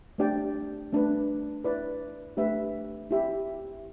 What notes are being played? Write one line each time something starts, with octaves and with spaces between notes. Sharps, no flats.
A3 D4 G4 D5 G5
A3 D4 B4
E4 B4 D5
A3 D4 G4 B4 E5
E4 G4 E5